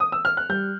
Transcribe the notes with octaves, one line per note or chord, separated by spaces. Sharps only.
D#6
E6
F6
F#6
G3 G6